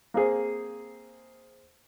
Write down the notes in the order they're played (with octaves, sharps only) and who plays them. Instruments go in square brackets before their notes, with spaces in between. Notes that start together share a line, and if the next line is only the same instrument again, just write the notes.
[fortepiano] A#3 C4 G#4 C5